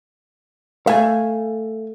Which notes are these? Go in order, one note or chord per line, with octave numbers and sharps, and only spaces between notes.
A3 F5 G#5